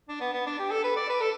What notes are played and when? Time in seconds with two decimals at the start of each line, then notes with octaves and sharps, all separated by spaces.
0.09 D4
0.20 B3
0.33 B3
0.46 D4
0.59 G4
0.71 A4
0.84 B4
0.96 D5
1.09 B4
1.21 A4